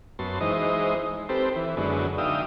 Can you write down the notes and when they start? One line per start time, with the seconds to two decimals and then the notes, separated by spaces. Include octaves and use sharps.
0.19 F#2 B3 A5 C6
0.41 E3 G#3 D#4 C5 D#5
1.29 C4 G4 A4 B4 C5
1.56 E3
1.77 F#2 D3 G#3 B3
2.18 D3 D#4 E5 F5 G5 D#6